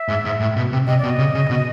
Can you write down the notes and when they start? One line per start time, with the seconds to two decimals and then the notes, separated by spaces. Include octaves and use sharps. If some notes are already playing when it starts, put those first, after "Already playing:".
Already playing: E5
0.08 G#2
0.25 G#2
0.40 A2
0.56 B2
0.72 C3
0.87 C3 D#5
0.99 B2 D5
1.10 D#5
1.19 C#3
1.34 C#3
1.50 B2